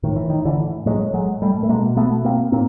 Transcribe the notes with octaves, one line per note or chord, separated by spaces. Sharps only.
A2 D#3
E3
D#3
D3 E3
A2 F#3 G#3
F#3 G#3
G3 A3
A3
B2 G#3 A#3
A3 B3
A#3 C4
A2 A#3 C4